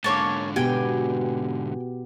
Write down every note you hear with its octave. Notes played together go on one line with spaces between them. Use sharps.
G#2 D3 A#3 C#5 A5
B2 B3 G4 G5 G#5